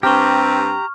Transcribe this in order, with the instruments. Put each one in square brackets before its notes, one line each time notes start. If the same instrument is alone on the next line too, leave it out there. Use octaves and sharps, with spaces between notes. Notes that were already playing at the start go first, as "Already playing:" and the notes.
[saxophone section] G2 C4 [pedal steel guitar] G4 [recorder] A#5 [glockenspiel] C#6 F6